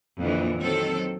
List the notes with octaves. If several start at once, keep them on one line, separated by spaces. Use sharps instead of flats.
F2 A#2 D3 E3
D#3 F#3 C4 A4